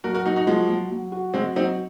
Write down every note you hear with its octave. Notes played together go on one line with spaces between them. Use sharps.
F#3 F#4 A#4
F#4 A#4
F#3 D#4 F#4
D#4 F#4
F3 F#3 G#3
F#3
F#3
F#4
F#3 G#3 C4
F#3 C4 D#4